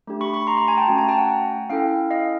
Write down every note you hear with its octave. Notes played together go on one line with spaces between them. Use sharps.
A3 D4 G4
B5 C#6
B5 C#6
A#5 C6
A#5 C6
G#5 A#5
G5 A5
A3 C#4 F#4 G#5 A#5
G#5 A#5
G5 A5
F#5 G#5
C#4 E4 A4 F5 G5
D#5 F5